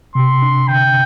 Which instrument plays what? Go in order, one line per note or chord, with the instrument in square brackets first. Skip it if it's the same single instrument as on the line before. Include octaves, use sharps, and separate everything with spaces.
[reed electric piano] C3 [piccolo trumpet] C6
[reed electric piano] D4
[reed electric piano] D3 [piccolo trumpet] G5